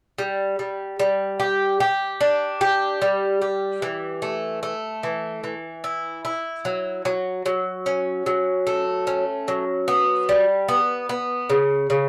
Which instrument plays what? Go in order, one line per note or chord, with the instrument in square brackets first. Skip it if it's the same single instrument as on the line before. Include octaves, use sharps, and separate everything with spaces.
[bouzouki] G3
G3
G3
G4
G4
D4
G4
G3
G4
E3
A3
A3
E3
E3
E4
E4
F#3
F#3
F#3
C#4
F#3
A3
C#4
F#3
B3
G3
B3
B3
C#3
C#3